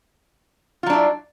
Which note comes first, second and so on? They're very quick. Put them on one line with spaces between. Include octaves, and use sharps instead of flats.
F4 F#3 D4 E4